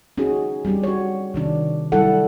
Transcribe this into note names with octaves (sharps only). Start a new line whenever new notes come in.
C#4 D#4 F#4 G#4
G3 C4 D4 G4
F#4 C#5
C3 D#3 D4
F#3 G3 D4 E4 A4 F#5